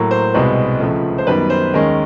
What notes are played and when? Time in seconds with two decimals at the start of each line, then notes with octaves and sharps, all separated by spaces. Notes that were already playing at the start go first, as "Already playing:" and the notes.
Already playing: A2 F#3 A#3
0.11 C5
0.34 C2 B2 G#3 C4 B4
0.80 C#2 C#3 F3 A3
1.18 C5
1.27 F#2 D#3 G3 B3 B4
1.50 C5
1.74 D#2 D#3 G#3 C#4 A#4